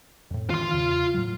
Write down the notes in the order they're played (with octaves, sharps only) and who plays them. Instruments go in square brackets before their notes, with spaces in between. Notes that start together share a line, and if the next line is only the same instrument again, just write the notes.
[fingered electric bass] F2 A2
[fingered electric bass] D#3 E3 [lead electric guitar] F4 C6
[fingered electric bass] E2 C#3
A2 F#3